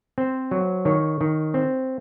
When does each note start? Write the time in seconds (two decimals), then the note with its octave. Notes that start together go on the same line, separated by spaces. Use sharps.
0.18 C4 C5
0.51 F#3
0.85 D#3 C#5
1.21 D#3
1.54 C4